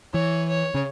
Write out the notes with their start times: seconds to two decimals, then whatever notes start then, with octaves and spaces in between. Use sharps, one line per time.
0.13 E3 C#5
0.48 C#5
0.74 C#3